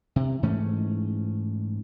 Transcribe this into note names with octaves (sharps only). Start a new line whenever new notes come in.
C3
G#2 E3 A3 C#4